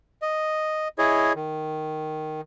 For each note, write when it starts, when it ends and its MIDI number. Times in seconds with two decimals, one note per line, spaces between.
0.22 0.88 75
0.98 1.33 64
0.98 1.33 68
0.98 1.33 73
0.98 1.33 75
1.35 2.41 51